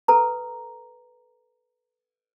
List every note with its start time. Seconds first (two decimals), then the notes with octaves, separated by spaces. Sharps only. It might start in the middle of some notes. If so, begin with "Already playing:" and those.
0.08 A4 B4 A#5